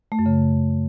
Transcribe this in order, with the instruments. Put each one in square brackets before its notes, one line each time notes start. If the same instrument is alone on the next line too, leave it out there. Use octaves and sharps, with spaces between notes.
[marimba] A3
F#2
C#3